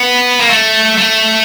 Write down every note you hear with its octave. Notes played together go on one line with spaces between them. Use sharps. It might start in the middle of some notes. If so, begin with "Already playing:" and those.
Already playing: B3
A#3
A3
A3